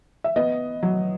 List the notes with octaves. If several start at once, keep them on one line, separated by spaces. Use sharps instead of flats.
E5
B3 D#5
F#3